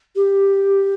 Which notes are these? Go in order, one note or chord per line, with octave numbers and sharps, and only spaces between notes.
G4